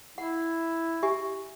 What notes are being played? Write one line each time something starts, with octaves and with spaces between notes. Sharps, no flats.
E4 F#5
G4 E5 G#5